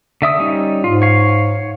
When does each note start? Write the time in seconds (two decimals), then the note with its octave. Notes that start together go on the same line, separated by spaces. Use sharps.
0.22 D3 E5 D#6
0.39 G3 C#4 D#4
0.84 G#2 F4
1.02 C#5 F5